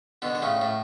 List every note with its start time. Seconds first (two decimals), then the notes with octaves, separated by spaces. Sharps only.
0.22 B2 D3
0.35 D3
0.42 A2 C#3
0.61 A2